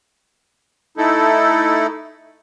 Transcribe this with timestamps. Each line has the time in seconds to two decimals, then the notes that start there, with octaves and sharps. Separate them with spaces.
0.97 A3 D#4 E4 A4